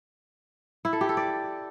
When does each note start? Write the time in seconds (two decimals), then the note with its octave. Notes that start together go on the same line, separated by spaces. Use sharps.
0.85 E4
0.93 A4
1.01 G4
1.09 A4
1.17 D5